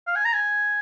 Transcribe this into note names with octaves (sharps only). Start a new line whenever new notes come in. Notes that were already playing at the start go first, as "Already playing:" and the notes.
F5
G#5
A#5
G#5